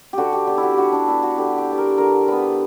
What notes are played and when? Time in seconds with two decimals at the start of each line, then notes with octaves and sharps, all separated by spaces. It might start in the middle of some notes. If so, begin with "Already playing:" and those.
0.13 D3 F#4 G4
0.32 G4
0.47 G3 B3 G4
0.57 E4
0.63 F#4
0.73 D3 F#4 G4
0.92 D4
1.08 G3 B3 E4
1.23 F#4
1.38 D3 G4
1.58 G4
1.68 G3 B3
1.78 A#4
1.98 D3 A#4
2.28 G3 B3 B4